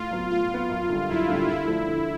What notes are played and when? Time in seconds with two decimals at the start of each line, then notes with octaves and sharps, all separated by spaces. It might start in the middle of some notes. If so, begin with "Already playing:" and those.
Already playing: A2 F4
0.11 F#3 B3
0.30 A2 F4
0.50 F#3 B3
0.69 F#2
0.89 D3 G3
1.09 F#2 E4
1.29 D3 G3
1.47 D3 E4
1.67 F3 A3 D4
1.87 D3